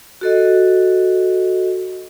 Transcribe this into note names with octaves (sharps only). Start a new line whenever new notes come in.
F#4 A4 D#5